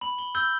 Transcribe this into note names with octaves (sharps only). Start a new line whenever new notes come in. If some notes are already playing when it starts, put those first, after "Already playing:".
B5 F#7
G7
E6 G6 G7